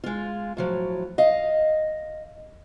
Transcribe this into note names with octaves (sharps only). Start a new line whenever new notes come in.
G#3 F4
A2 F3 F#3
D#5 F5